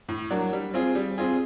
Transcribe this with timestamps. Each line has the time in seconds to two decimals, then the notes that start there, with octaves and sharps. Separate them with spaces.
0.09 A2
0.30 F#3 A#3 D4
0.53 G3
0.74 C4 F4 G#4
0.95 G3
1.18 C4 F4 G#4